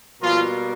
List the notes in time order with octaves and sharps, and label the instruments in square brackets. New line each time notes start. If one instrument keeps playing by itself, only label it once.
[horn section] B2 F3 G3 A#3 F4